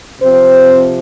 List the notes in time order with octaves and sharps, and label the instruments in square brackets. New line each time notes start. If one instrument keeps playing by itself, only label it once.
[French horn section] C3 F3 C4 C5